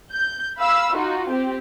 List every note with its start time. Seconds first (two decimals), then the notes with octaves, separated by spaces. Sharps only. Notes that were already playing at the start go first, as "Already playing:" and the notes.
0.12 G6
0.58 F5 B5 E6
0.95 D#4 F4 F#4
1.28 C4 G4